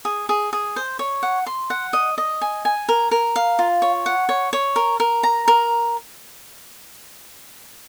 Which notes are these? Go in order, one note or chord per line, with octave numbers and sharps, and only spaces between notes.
G#4
G#4
G#4
C5
C#5
F#5
C6
F#5
D#5
D#5
G#5
G#5
A#4
A#4
F5
F4
C#5
F#5
C#5
C#5
A#4
A#4
A#5
A#4